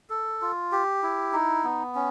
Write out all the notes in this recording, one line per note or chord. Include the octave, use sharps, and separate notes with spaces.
A4
F4
G4
E4
D#4
B3
C#4